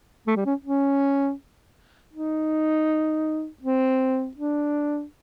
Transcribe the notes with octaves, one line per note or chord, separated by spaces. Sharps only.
A3
G3
C#4
C#4
D#4
C4
D4